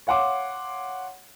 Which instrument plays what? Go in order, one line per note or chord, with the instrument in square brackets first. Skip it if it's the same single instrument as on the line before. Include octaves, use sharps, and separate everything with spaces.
[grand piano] C#5 F5 F#5 C6 D6